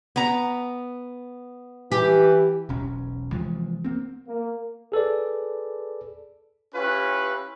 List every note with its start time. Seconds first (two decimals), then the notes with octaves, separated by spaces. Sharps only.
0.16 B3 A#5
1.92 E3 G4
2.69 E1 B1 C#4
3.32 C3 E3 F3 G#3
3.84 A#3 C4
4.28 A#3
4.92 G#4 A4 B4 D5
6.75 C#4 E4 F4 G4 B4